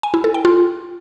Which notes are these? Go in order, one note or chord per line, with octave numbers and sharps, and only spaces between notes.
G#5
E4
A4
G5
F4